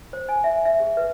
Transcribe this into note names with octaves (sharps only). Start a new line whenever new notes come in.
C5
G#5
E5
E5
G#4
B4